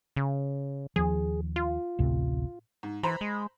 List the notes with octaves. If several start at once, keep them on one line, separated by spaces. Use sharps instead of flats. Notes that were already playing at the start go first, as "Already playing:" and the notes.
C#3
D#2 F3 G#4
F4
A1 D2 C3
G#2
E3 C5 A#5 B5
G#3